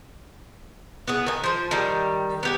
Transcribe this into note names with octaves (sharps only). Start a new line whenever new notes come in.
B3 E4 G#4
D#3 G#5
F3 C5
D#3 G3
B3 G4 G#5